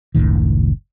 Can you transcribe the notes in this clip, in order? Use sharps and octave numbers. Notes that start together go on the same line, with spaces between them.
F#1 C#2 A2 D#3